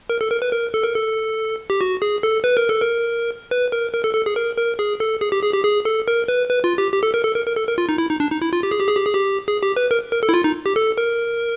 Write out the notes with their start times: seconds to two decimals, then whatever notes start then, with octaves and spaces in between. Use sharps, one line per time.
0.10 A#4
0.21 A4
0.30 A#4
0.42 B4
0.52 A#4
0.74 A4
0.83 A#4
0.94 A4
1.70 G4
1.81 F#4
2.02 G#4
2.23 A4
2.44 B4
2.57 A#4
2.69 A4
2.81 A#4
3.51 B4
3.72 A#4
3.94 A#4
4.04 A4
4.14 A4
4.26 G#4
4.36 A#4
4.58 A#4
4.79 G#4
5.00 A4
5.21 G#4
5.32 G4
5.43 G#4
5.54 G4
5.64 G#4
5.85 A4
6.08 A#4
6.28 B4
6.49 B4
6.64 F4
6.78 G4
6.92 G4
7.03 A4
7.14 A#4
7.25 A4
7.35 A#4
7.46 A#4
7.56 A4
7.67 A#4
7.78 F4
7.89 D#4
7.98 E4
8.09 D#4
8.20 D4
8.31 D#4
8.42 E4
8.53 F4
8.63 G4
8.71 G#4
8.80 G4
8.88 G#4
8.96 G4
9.05 G#4
9.13 G4
9.48 G#4
9.63 G4
9.76 B4
9.91 A#4
10.12 A#4
10.23 A4
10.29 E4
10.34 F4
10.44 D#4
10.66 G4
10.76 A4
10.98 A#4